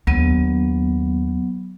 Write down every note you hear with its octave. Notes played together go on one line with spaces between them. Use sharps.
D#2 F#3 B3 D4